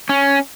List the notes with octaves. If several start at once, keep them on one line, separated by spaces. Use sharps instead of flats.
C#4